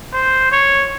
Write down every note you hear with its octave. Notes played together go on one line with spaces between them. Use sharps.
C5
C#5